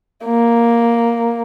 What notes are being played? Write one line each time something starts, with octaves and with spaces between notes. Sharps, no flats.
A#3